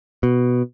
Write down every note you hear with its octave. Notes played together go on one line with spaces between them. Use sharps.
B2